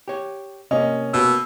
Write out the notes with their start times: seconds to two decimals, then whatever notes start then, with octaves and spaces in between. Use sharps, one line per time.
0.08 G4 C#5
0.71 C3 A#3 C#4 D#5
1.13 B2 E6